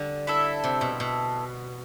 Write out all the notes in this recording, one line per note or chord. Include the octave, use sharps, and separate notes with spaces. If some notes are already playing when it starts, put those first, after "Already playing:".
Already playing: D3 G3
E4 A4 E5
C3
B2
B2